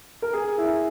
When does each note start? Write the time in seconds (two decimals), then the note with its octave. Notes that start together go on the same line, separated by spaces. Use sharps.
0.22 A#4
0.33 G#4
0.58 E4